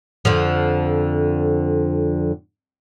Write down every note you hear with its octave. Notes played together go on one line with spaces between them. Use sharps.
F2 D3 F3